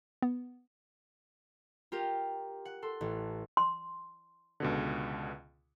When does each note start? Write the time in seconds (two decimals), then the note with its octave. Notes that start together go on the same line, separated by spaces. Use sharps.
0.22 B3
1.92 F4 G4 A#4
2.65 F#5
2.82 A4 C6
3.01 A1
3.57 C6
4.60 C#2 B2 D3